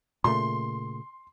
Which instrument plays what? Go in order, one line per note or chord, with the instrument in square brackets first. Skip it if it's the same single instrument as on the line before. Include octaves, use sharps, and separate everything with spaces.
[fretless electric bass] A#2 C#3 A3 [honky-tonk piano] C6